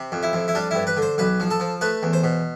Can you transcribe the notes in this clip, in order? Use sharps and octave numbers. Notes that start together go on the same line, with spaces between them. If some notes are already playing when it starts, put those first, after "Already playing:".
Already playing: C3
F2
E4
F2
E4
G3 D4
G2 E4
B4
D3
C5
B1 B4
F3
A4
F3
A3 B4
E2
C5
B2